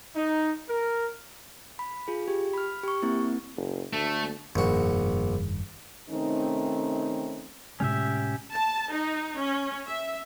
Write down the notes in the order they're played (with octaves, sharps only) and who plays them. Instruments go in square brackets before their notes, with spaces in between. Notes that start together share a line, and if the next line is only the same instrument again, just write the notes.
[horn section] D#4
A#4
[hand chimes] B5
F4 G#4
G4
B5 F6
G4 C#6
A#3 C4 E4
[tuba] F#1
[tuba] D2 [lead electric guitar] A3
[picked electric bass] F1 G2 D#3 [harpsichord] A#1 F#4
[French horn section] C3 D#3 A3 C4 C#4 D#4
[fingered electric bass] A2 C3 G#3 [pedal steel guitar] C#4 G4 E5
[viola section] A5
D#4
C#4
E5